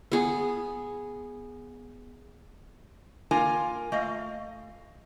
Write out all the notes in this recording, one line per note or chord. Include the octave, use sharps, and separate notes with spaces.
B3 G#4
A#3 F4 A#4 G#5
A3 D#5 F5